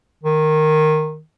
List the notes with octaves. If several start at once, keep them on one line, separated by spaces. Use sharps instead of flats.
D#3